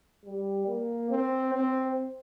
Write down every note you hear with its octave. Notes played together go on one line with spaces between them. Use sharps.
G3
A#3
C4
C4